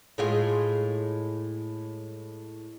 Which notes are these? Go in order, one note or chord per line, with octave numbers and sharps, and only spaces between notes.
A2 G#3 F4